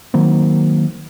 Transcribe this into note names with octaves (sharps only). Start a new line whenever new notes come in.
D#3 F#3 A#3 C4